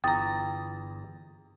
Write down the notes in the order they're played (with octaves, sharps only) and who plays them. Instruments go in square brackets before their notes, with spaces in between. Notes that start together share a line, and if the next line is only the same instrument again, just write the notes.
[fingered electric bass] G1 [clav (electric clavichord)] E2 A#5 [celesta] G5 D#6 A6